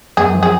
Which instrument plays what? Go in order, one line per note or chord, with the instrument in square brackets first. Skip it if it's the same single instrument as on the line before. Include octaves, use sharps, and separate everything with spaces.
[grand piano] F#2 [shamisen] G#4
[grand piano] F3
[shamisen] G#4